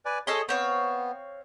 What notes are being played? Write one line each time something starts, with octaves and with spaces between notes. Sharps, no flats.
B4 D5 G#5
G#4 A4 C#5 D#5 C6
B3 C4 C#5 F5